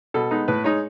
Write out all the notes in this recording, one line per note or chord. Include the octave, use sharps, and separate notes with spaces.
B2 A4
G#3 B3 D#4
A2 B4
G#3 D#4 C#5